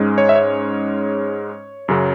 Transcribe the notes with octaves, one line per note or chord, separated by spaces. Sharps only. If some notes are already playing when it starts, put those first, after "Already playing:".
Already playing: G#2 G#3 C#4
C#5
E5
C#5
F#2 C#3 F#3